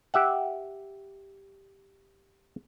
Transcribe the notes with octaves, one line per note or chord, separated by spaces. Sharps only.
G4 E5 F#5